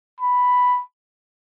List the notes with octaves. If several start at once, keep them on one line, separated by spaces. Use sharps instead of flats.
B5